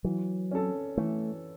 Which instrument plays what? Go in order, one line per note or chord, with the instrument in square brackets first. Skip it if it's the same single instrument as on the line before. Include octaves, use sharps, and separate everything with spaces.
[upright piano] E3 [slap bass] F#3
[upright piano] C#4 A4
[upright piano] E3 [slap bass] A3